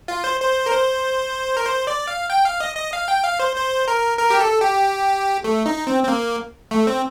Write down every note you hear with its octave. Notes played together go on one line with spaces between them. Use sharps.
F4
C5
C5
A#4
C5
A#4
C5
D5
F5
G5
F5
D#5
D#5
F5
G5
F5
C5
C5
A#4
A#4
G4
A4
G4
A3
D#4
C4
C4
A#3
A3
C4